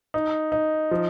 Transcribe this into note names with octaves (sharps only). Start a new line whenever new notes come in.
D#4
D#4
F3